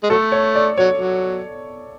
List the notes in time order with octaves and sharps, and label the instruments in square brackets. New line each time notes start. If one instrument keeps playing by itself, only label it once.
[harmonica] G#3
[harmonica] F#3 A3 [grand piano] A4
[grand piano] C#5
D5
[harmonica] F#3 [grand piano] C#5
[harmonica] F#3